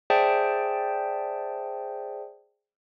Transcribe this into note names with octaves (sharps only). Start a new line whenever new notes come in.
G#4 C5 D5 E5 G5 A5